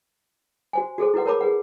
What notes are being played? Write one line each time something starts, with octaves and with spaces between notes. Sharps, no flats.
F#4 C5 G#5
F#4 G#4 A4 C5
E4 F#4 B4 F#5
A#4 C#5 A5 B5 D6
G#4 B4 F#5